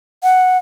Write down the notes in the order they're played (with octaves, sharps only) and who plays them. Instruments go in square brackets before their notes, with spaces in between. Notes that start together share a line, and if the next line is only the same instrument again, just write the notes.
[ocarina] F#5